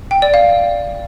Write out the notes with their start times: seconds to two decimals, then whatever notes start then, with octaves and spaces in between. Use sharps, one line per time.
0.11 G5
0.22 D5
0.34 F5